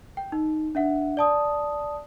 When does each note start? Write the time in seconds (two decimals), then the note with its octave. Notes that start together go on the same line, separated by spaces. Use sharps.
0.17 G5
0.32 D#4
0.75 D4 E5 F#5
1.17 D5 A5 D#6